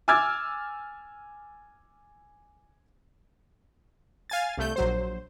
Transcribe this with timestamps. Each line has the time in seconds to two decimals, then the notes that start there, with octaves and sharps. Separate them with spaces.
0.08 G#5 D6 E6 F6 G#6 A6
4.30 F5 G#5 A6
4.57 C2 A3 G6
4.76 A#1 F#3 C5